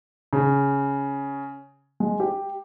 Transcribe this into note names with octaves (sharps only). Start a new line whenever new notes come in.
C#3
G#3
G4